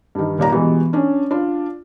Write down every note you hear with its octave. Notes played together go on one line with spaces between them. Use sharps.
G2 D#3
D#1 D#2 D5 A#5
B2 E3 G3 G#3 B3
C#4 D4
D4 F4